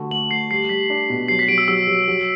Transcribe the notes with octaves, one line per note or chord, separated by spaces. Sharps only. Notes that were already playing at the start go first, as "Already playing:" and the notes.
Already playing: D3 A3 F#4
A3 F#7
A3 C7
G3 C7
G3 B6
D4
B2
F#3 C7
B6
F#3 D7
E6
F#3 E6
F#3
F#3